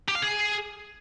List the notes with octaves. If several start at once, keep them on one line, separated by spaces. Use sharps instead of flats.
G4
F5
G#4